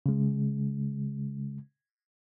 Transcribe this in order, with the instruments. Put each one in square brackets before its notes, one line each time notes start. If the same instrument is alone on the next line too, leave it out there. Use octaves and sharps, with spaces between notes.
[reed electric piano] C#3 G#3